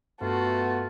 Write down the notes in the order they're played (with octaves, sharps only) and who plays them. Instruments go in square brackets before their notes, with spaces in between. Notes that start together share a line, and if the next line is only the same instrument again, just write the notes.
[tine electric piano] G2 [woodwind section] A3 F4 [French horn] B3 [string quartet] F#4 A4